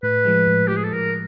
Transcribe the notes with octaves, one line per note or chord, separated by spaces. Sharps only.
A2 B4
F3 G#3
A2
F3 G#3 G4
G#4
A4
A2 A#4